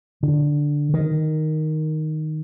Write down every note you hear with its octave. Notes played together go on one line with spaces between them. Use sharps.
D3
D#3